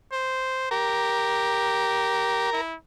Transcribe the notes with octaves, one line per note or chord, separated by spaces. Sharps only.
C5
G4 A#4
E4